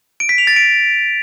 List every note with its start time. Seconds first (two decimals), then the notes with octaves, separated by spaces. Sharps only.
0.20 D7
0.29 B6
0.38 F7
0.47 A6
0.56 D7